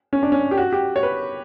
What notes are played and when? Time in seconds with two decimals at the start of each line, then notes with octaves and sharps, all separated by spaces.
0.13 C#4
0.23 D4
0.32 C#4
0.51 G4
0.57 F#4
0.72 G4
0.96 C#5
1.03 B4